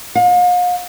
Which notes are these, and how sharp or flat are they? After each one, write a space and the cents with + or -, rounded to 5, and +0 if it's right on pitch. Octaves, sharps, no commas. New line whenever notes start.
F5 +45